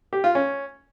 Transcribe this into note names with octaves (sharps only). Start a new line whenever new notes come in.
G4
F4
C#4